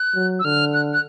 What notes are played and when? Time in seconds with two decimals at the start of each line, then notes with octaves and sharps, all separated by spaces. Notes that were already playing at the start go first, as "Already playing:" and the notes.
Already playing: F#6
0.15 F#3
0.39 E6
0.44 D3 F6
0.74 F#6
0.93 F#6